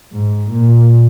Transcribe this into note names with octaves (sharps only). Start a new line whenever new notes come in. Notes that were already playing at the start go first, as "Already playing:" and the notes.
G#2
A#2